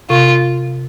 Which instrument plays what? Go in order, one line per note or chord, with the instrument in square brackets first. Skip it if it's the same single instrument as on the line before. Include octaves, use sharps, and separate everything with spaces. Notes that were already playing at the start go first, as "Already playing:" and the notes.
[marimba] C3 [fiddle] F4